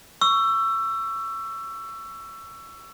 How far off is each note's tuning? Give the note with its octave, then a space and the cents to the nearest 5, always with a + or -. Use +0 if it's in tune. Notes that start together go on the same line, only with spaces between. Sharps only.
C#6 +15 E6 +20